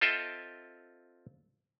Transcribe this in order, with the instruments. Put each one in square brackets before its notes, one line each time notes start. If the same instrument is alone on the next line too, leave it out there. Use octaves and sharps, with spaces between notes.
[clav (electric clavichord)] C4 F4 A4 D#5 E5 G5